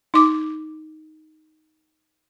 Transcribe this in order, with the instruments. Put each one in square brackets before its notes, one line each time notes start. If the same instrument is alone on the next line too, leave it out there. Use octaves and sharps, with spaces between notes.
[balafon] D#4 D6